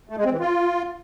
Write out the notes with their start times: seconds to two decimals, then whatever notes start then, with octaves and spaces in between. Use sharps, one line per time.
0.09 A3
0.17 G#3
0.25 C4
0.32 E3
0.40 F4